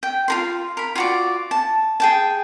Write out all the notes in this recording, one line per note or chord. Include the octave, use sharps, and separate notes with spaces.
G5
F4 A#4 C6
A#4 B5
F4 F#4 D5
A5
G#4 G5 A5